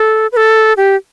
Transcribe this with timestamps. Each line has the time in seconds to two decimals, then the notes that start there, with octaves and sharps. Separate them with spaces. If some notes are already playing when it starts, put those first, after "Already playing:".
Already playing: A4
0.32 B4
0.37 A4
0.77 G4